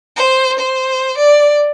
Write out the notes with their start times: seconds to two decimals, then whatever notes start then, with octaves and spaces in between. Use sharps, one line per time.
0.17 C5
0.59 C5
1.18 D5